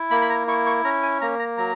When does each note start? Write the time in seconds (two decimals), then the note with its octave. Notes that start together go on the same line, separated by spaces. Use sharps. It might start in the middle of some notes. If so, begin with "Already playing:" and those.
Already playing: E4
0.11 A#3 B5
0.22 B5
0.30 A#5
0.47 E4 C#6
0.66 C#6
0.84 C#4 A#5
1.02 G#5
1.21 A#3 A#5
1.39 A#5
1.58 F#3 A#5